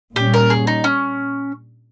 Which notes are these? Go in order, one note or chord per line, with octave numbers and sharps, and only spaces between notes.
A#2 G3 C#4 G4
A#4
G#4
D#4
C#4